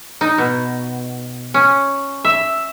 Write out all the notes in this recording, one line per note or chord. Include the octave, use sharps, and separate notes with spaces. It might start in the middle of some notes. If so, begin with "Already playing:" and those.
D#4
B2
C#4
E5